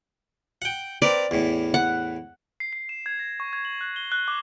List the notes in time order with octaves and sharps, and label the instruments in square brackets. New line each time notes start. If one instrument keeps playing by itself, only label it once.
[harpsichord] F#5 G5
[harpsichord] C4 A#4 B4 [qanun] D5
[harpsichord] E2 A2
[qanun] F#5
[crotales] C7
C7
E7
G#6
A#6
C#6
G#6
F#7
F#6
G7
F#6
D6